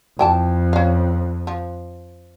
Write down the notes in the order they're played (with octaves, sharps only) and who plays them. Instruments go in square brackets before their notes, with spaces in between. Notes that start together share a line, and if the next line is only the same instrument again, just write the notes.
[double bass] F2 [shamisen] E3 G5 A5
[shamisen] C#4 F5
F3